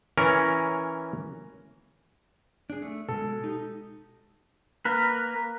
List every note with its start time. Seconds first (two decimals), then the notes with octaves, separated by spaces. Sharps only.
0.18 E3 C#4 A#4
2.70 D4 G#4
2.82 A3
3.09 B2 G#3 A4
3.44 D#4 G4
4.85 A#3 A#4 B4